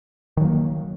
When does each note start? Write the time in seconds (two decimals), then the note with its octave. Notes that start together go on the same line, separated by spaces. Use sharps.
0.37 D#3
0.41 F#3
0.44 A#3